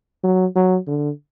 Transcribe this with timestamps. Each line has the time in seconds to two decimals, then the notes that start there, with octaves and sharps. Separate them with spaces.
0.24 F#3
0.56 F#3
0.88 D3